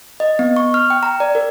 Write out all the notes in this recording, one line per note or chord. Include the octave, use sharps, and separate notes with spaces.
D#5
B3
C#6
F6
G5
A#5
D5
A#4